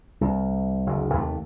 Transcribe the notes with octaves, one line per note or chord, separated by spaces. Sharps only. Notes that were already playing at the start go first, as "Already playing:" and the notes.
C2
F#1 D2
D#2 C3 G#3 A3